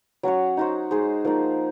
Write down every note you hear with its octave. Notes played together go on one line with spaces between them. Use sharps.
F#3 C#4 F#4 C#5
D#4 F#4 C5
G#3 D#4 G#4 C5
F3 A#3 D#4